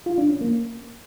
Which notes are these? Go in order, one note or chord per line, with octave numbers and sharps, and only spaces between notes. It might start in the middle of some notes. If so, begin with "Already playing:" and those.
F4
D4
C#4
A#3